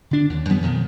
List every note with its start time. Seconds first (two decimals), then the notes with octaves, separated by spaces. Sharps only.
0.11 D3 D4
0.30 D#2
0.49 F#2 F3 G3 B3
0.62 F2 B2 D#3